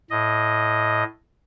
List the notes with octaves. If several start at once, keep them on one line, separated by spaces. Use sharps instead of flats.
A2 D#5